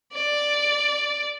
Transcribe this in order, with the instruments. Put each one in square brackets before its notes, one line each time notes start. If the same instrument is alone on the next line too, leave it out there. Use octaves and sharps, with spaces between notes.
[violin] D5